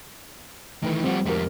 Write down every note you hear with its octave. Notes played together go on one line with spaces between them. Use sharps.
D#3 E3 A3 B4
F3 G3 C4 F#4
F2 G3 G#3 F#4 A#4